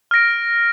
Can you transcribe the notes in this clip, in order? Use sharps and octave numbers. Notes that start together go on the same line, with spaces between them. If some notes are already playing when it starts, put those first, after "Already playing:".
F6 A#6 D7